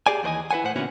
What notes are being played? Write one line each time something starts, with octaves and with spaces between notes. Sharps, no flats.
G4 G#4 D5 G#5
D#2 E3 C5 D#5 G#5
E4 B4 C5 F#5 G#5
A2 C5 F#5
A#2 D3 B3 C#4 E4 F#4